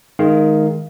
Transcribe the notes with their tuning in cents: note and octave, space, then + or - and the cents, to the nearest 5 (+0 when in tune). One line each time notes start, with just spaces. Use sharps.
D#3 +0 G#3 +20 F5 +0